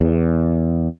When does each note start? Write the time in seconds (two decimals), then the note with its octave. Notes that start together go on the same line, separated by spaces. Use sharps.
0.01 E2